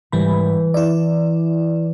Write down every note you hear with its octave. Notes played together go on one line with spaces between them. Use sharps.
G#2 E3 G3 B5
E4 D5